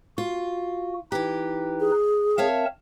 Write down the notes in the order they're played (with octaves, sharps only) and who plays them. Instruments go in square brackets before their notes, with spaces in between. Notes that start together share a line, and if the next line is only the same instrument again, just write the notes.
[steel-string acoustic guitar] F4 [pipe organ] F#4
[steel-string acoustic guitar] E3 G4 [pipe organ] D#4 B4
[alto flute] G#4
[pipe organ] C4 A#4 A5 [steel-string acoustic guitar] C#5 E5 F5